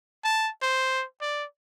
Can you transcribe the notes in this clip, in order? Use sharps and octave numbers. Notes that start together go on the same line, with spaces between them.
A5
C5
D5